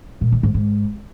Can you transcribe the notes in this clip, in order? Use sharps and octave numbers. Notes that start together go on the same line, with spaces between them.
A#2
D#3
G#2
G#2